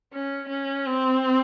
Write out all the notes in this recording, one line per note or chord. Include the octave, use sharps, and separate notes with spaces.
C#4
C#4
C4